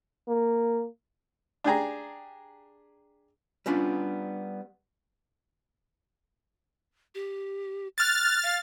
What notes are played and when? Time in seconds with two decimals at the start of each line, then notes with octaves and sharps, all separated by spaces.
0.28 A#3
1.64 D4 G4 G#4 A#5
3.66 G3 B3 C#4 D4 F4
7.15 G4
7.98 F6 F#6 A6
8.43 F5